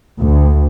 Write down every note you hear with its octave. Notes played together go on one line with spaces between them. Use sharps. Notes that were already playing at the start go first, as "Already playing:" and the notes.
D2